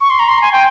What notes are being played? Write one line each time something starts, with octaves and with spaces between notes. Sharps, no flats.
C#6
C6
A#5
C6
G#5
G5